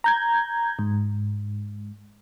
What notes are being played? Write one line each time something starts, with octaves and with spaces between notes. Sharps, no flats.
A#5 G6 G#6
G#2